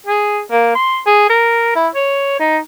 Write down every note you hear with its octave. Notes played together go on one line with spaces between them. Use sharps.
G#4
A#3
C6
G#4
A#4
E4
C#5
D#4